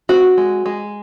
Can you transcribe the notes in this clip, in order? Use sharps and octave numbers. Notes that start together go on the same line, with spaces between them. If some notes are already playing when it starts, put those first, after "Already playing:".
C4 F#4
G#3
G#3